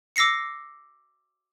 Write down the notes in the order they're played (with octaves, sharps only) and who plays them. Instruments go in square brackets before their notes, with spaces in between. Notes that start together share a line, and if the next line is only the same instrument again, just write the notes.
[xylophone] D6 E6 A#6 C7 C#7